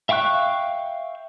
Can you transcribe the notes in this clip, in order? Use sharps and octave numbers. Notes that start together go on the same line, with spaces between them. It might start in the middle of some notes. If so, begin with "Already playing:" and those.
E5 F5 G5 C#6 F#6